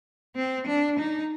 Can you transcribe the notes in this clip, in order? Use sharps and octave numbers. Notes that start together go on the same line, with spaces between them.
C4
D4
D#4